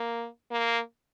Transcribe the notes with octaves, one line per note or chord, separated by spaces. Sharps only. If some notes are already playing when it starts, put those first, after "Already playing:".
Already playing: A#3
A#3